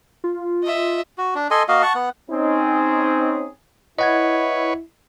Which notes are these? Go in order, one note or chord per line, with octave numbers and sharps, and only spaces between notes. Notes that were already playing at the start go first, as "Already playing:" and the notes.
F4
D#5 E5
F#4
D4
A4 D#5 G#5 C6
A#3 F#4 D#5 F5
F#5 A5 C#6
B3 F#5
C4 C#4 D#4 G#4
E4 B4 C#5 D#5 F#5 G#6